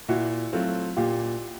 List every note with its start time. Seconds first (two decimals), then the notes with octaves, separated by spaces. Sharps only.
0.08 A#2 E4 F#4
0.53 F#3 A3 C4 F4
0.97 A#2 F4 G4